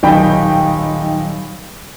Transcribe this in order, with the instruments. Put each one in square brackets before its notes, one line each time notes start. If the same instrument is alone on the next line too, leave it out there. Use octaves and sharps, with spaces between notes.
[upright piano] D#1 B1 D#4 G5 B5